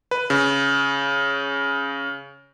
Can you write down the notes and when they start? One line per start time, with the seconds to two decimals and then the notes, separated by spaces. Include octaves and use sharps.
0.11 B4
0.30 C#3